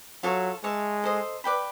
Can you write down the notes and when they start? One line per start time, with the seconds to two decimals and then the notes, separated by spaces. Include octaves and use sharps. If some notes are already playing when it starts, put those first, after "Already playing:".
0.23 F#3 F4 A4 C#5
0.64 G#3 C#5 E5 A5
1.04 A4 C5 D#5
1.44 B4 D5 G5 B5